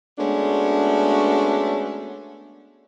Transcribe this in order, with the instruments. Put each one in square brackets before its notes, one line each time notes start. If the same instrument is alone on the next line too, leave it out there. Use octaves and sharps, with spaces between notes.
[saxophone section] G#3 A3 B3 C#4 D4 F#4